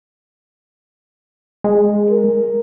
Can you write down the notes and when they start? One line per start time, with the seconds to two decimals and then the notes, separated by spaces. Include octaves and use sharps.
1.64 G#3
2.11 A#4